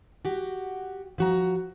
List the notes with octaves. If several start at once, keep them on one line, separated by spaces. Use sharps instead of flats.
F#4 G4
F3 F#4 A#5